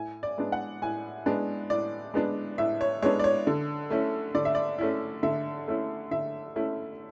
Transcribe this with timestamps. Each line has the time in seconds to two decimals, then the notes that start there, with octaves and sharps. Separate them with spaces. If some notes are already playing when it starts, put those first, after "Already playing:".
Already playing: A2 G#5
0.23 D5
0.38 G#3 B3 D4
0.52 F#5
0.82 A2 G#5
1.26 G#3 B3 D4
1.70 A2 D5
2.14 G#3 B3 D4
2.58 A2 E5
2.81 C#5
3.02 G#3 B3 D4 C#5
3.20 D5
3.24 C#5
3.47 D3
3.90 A3 C#4 E4
4.35 D3 D5
4.45 E5
4.55 D5
4.78 A3 C#4 E4
5.23 D3 E5
5.68 A3 C#4 E4
6.11 D3 E5
6.56 A3 C#4 E4